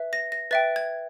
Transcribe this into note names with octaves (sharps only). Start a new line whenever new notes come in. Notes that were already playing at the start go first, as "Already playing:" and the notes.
Already playing: B4 E5
A#6
A#6
B4 E5 G5 A6
G#6